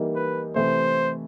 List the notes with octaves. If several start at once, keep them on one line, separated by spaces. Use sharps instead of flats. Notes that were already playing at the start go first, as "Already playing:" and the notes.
Already playing: E3 G3 A#3 D#4
B4
C3 E3 A3 C5